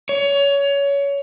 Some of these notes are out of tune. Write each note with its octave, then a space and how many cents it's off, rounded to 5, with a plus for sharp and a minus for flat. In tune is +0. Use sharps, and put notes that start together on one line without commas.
C#5 +20